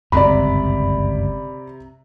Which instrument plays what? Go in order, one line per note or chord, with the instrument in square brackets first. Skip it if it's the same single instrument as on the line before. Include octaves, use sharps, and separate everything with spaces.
[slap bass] G1 C#2 F#2 [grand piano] C3 A#5 [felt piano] D5 B5